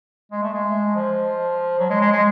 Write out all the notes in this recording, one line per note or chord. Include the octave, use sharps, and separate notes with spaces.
G#3
A3
G#3
F3
F#3
G#3
G#3
G#3